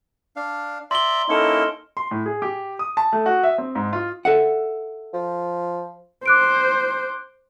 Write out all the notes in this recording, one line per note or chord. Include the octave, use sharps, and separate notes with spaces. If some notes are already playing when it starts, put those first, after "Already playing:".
D4 F5
D5 E5 A#5 C6 G7
A#3 C#4 D#4 E4 A4 A#4
C6
A2
G#4
G4
D#6
A5
A3
F#4
E5
C4
G#2
F4
A4 E5 F#5
F3
C5 D6 F#6 D7